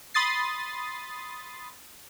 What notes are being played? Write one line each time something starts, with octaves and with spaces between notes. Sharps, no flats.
B5 C6 D#6 A6 C7